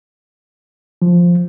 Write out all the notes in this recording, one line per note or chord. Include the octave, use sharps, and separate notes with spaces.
F3